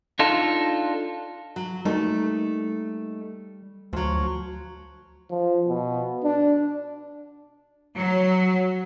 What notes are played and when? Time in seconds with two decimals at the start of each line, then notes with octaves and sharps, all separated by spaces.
0.19 D4 D#4 F4 A4
1.56 F#3
1.85 G3 A3 A#3 D#4
3.93 D2 F3 F#3
5.30 F3
5.68 B2
6.24 D4
7.96 F#3